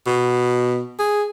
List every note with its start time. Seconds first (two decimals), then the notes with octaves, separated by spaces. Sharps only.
0.06 B2
0.99 G#4